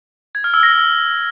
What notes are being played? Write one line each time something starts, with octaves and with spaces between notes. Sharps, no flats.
G#6
F6
E6
A#6